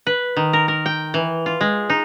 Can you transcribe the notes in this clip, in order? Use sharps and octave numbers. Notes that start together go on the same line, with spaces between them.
B4
D#3
A#4
A#4
G5
E3
F4
G#3
D#4